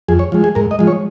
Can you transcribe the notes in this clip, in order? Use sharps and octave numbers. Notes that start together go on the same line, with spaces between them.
F2 G#4
C#5
F3 G#3
G#4
G#2 A#4
D#5
F3 G#3
C#5